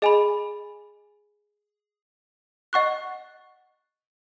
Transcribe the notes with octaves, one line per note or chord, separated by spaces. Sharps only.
G#4 D#5 G#5 B5
D#5 F#5 C#6 F#6